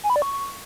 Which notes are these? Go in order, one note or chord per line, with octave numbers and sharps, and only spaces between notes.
G#5
B5
D5
C#6